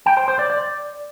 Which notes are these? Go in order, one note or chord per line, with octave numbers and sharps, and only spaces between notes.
G5
C5
C5
D5
D5